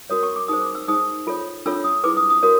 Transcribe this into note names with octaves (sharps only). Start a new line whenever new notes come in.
F#4 A#4 C#5 D#6
C#6
D6
D#4 G#4 C5 D#6
D6
E6
D#4 G#4 C5 D#6
F4 A4 C#5
D4 F4 A4 C#5 E6
D#6
E4 G#4 B4 D6
D#6
D#6
F#4 A#4 C#5 D#6